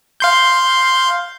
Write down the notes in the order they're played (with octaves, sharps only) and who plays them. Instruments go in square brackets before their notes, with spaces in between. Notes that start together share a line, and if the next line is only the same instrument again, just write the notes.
[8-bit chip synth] F5 C6 G6